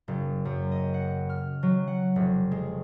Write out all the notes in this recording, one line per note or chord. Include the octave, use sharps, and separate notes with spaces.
F#1
F#2
D#5
F#5
F6
F#3
F#5
F1
G#3